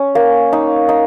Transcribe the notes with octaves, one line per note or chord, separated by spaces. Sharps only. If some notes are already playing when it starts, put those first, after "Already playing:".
Already playing: C#4
A#3
D#4
D#4